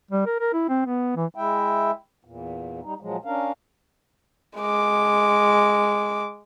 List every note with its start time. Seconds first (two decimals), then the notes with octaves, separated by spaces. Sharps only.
0.11 G3
0.26 A#4
0.40 A#4
0.53 E4
0.69 C4
0.86 B3
1.16 E3
1.35 G#3 E4 E5 G5
2.25 E2 A#2
2.83 G3 D#4
3.01 A#2 F3 F#3 G#3
3.25 C#4 D4 A#4 F5
4.58 G#3 D6